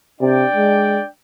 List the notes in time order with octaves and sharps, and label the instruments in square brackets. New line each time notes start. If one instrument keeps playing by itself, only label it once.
[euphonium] C3 [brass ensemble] D4 D5 G5
[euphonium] G#3